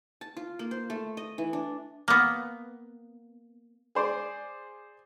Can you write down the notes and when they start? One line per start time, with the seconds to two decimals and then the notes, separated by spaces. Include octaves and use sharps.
0.21 A5
0.37 F4
0.59 A#3
0.71 C5
0.90 A3
1.17 D#5
1.38 E3
1.53 D4
2.08 A#3 B3
3.95 G#4 C5 D5